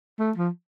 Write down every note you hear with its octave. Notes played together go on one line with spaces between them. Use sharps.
A3
F3